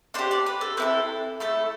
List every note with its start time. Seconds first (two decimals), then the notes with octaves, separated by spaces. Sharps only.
0.14 D4 G4 C5
0.31 D5
0.46 B4
0.61 A4
0.77 C4 E4 A4 B4
1.40 A3 E4 A4